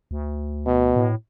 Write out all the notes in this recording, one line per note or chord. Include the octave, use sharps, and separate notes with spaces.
D2
B2
A2